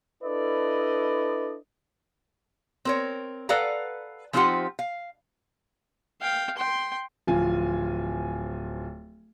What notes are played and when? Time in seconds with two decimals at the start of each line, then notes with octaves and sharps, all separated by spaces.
0.23 D4 E4 A4 B4 D5 D#5
2.85 C4 A#4 C#5
3.49 A4 B4 D5 F5 F#5 A#5
4.33 F3 C4 D#4 F4 G4 F#5
4.79 F5
6.21 F5 G5
6.57 G5 C6
7.27 D1 F3 F4 G#5